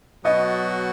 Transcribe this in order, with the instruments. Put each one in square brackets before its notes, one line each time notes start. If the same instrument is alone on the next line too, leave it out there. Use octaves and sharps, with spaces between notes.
[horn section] B2 F#3 B3 F#4 [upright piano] D#5